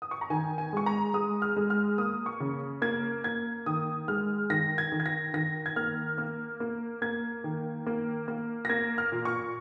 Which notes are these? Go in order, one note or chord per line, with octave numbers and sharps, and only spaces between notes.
D#6
C#6
A#5
D#3 G#5
G#5
G#3 C#6
A#5
G#3 D#6
F6
G#3
F6
A#3 D#6
C#6
C#3
A#3 G#6
A#3 G#6
D#3 D#6
G#3 F6
D#3 A#6
G#6
D#3
G#6
A#6
D#3 A#6
G#6
A#3 F6
A#3
A#3
A#3 G#6
D#3
A#3
A#3
A#6
A#3 G#6
F6
A#2
C#6